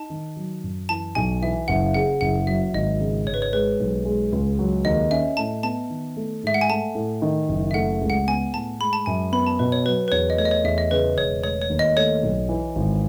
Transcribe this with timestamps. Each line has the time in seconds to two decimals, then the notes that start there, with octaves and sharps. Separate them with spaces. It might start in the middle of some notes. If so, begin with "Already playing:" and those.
Already playing: D#4 A5
0.10 D#3
0.36 F#3
0.64 F#2
0.89 E3 A5
1.15 B1 G#5
1.42 E3 E5
1.68 F#1 F#5
1.94 C#3 F#5
2.21 F#1 F#5
2.47 F#3 E5
2.74 G#1 D#5
3.00 C#3
3.26 G#1 C#5
3.34 B4
3.42 C#5
3.53 G#3 B4
3.79 B1
4.05 G#3
4.32 C#2
4.59 F#3
4.85 D#2 D#5
5.11 C#4 E5
5.37 A2 A5
5.63 B3 A5
5.90 D#3
6.16 A3
6.43 G#2 E5
6.54 F#5
6.61 G#5
6.69 A3 A5
6.95 A2
7.22 D#3
7.49 F#1
7.71 E5
7.74 A3 F#5
8.01 C#2
8.10 F#5
8.27 B3 G#5
8.53 A2 A5
8.79 G#3 B5
8.93 A5
9.06 F#2 G#5
9.32 B3 B5
9.46 A5
9.59 B2 B4
9.72 C#5
9.86 F#3 B4
10.08 B4
10.12 E2 C#5
10.30 D#5
10.38 A3 C#5
10.45 D#5
10.51 C#5
10.64 E2 E5
10.78 D#5
10.91 C#3 B4
11.17 E1 C#5
11.44 A3 C#5
11.62 C#5
11.70 D#2
11.79 D#5
11.97 A3 C#5
12.23 B1
12.49 E3
12.76 G#1